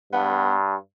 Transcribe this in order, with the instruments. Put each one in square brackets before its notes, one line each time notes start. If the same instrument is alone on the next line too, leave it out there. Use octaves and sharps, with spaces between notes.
[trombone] G2 [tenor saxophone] B3